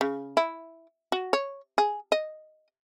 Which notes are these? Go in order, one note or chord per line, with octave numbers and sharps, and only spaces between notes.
C#3
E4
F#4
C#5
G#4
D#5